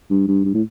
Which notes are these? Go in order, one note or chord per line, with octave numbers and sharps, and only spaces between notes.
G2
G2
G2
A2